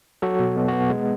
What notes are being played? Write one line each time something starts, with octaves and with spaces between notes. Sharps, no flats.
F#3 F#4 A4
B2
B2
B3 F#4
G#3